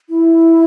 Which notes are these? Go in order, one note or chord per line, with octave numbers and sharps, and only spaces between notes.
E4